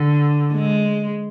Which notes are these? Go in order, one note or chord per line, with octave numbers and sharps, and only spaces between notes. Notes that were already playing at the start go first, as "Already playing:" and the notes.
Already playing: D3
G#3